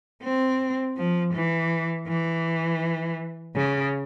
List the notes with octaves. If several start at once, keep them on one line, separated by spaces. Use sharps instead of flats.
C4
F3
E3
E3
C#3